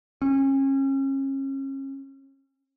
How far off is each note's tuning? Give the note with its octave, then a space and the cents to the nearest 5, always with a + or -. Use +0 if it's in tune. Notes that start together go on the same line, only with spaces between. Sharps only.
C#4 -35